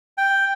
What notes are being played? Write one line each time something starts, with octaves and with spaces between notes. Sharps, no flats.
G5